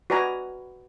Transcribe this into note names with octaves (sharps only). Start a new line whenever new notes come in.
F#4 B4 D5 G#5 A#5